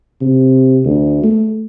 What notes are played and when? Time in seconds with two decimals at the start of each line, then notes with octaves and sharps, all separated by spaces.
0.21 C3
0.85 D2
1.24 A3